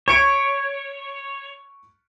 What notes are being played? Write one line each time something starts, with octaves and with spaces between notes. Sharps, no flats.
C#5 C#6 C#7 D7